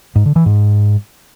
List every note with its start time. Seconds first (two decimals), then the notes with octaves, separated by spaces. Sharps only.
0.16 G#2
0.26 D3
0.36 E3
0.46 G#2